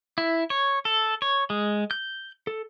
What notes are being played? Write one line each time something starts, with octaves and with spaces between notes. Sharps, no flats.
E4
C#5
A4
C#5
G#3
G6
A4